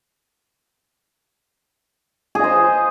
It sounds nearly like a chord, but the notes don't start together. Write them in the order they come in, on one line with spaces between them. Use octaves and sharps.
G#4 D#5 C5